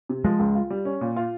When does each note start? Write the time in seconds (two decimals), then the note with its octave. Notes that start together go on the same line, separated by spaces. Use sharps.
0.09 C3
0.24 F3 G#3
0.39 C#2
0.55 F4
0.70 G3
0.85 C#4
1.01 A#2
1.16 F4